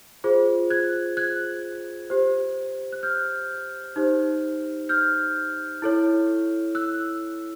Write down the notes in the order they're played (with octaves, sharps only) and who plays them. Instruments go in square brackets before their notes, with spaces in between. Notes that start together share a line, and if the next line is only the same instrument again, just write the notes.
[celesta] F4 G#4 C5
F#6 G#6
F#6 G#6
G4 C5
F#6
F6 G6
D#4 G4 C5
F6 G6
E4 A4 C#5
E6 F#6